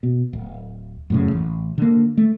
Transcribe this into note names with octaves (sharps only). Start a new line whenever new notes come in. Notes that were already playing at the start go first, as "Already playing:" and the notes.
B2
D1
F#2 A2 C#3
A1
D3 A#3
A3